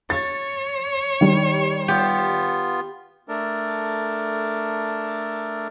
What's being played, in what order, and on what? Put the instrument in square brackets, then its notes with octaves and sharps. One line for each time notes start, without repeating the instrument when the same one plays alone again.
[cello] C#5 [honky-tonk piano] A6
[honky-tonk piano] D#3 G3
[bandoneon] B3 F4 [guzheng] G4
[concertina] A3 D4 A4 A#4